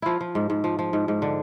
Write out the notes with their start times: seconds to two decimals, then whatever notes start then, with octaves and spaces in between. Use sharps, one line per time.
0.02 F3 E4 F4
0.21 F3
0.35 G#2
0.50 G#2
0.64 F3
0.79 F3
0.93 G#2
1.08 G#2
1.22 D3